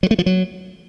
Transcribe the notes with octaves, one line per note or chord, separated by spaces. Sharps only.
F#3
A3
F3
F#3